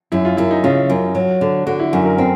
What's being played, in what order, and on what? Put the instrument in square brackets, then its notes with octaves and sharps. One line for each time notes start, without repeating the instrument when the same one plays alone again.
[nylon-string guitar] F#2 [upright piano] E4
[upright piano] F4
[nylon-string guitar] F#2 [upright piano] E4
[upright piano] D#4
[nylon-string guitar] C#3 [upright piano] F4
[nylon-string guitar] F#2
F#3
D3
[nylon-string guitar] D3 [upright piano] F#4
[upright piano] E4
[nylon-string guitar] F#2 [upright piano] F#4
[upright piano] A#4
[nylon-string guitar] C4